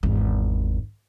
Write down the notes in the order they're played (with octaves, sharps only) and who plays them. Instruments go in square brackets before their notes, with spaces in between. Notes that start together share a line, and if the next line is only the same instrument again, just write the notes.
[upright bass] G#1 E2